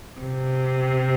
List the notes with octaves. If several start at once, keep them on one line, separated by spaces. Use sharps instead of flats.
C3